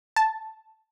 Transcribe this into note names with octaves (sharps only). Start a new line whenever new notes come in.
A5